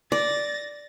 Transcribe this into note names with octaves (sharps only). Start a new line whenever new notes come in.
D5 A6 A#6